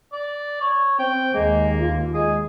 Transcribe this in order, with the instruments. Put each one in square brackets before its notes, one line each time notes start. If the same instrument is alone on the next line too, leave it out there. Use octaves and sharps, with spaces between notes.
[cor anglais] D5
C#5
[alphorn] C4 [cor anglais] G5
[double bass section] D#2 [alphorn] G#3 [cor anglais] A#3
[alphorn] F4
[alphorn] G#3 [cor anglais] G#4